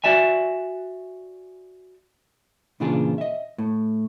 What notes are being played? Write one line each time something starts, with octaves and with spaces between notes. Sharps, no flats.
F#4 D5 E5 G#5
A#2 C#3 E3 D4 F4 G#4
D#5 E5
A2